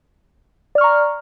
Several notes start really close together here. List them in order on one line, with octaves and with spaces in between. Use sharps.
D5 F6 C#6 A#5